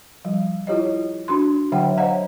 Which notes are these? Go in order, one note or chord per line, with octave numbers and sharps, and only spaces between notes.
F3 G3
E4 F4 G4 C#5 D#5
D4 F#4 C6
D3 F#3 C#5 E5 F#5 G5
C5 C#5 D#5 F5 F#5 A#5